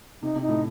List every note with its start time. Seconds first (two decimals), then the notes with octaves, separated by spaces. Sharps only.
0.22 C3 D#4
0.35 C3
0.42 D#4
0.49 A2